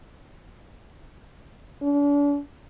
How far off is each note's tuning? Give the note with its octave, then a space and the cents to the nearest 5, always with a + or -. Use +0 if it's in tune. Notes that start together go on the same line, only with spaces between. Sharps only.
D4 -40